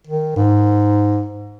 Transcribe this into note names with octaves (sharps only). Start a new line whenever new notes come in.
D#3
G#2